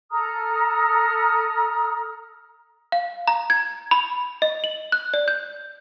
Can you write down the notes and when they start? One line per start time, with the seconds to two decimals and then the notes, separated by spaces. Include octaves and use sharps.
0.11 A4 A#5 D#6 F6
2.92 F5
3.28 A#5
3.50 G#6
3.91 B5
4.42 D#5
4.64 F#7
4.92 F#6
5.14 D5
5.28 G6